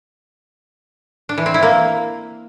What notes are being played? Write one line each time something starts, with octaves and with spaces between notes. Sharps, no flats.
D4
E3
C4
E4
A#3